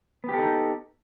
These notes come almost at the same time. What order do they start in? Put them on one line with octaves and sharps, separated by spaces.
B3 G4 A4 D#4